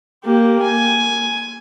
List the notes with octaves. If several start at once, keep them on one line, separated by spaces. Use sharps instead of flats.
A#3 G4
G#5